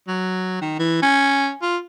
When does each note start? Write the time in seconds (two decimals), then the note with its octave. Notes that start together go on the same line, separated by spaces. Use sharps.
0.08 F#3
0.61 D#3
0.79 E3
1.02 C#4
1.62 F4